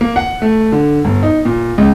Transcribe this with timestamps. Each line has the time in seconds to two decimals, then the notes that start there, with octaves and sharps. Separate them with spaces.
0.01 A#3
0.16 F#5
0.42 A3
0.72 D3
1.05 G1
1.23 D#4
1.45 A#2
1.78 C#2